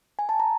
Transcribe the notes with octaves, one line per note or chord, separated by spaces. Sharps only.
G#5
A5
A#5